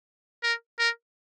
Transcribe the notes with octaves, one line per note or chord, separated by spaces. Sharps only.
A#4
A#4